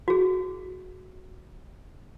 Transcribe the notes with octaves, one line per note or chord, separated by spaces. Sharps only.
F#4 G#4